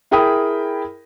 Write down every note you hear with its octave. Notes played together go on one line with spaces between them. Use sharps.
E4 G#4 A#4 G5 B5 D#6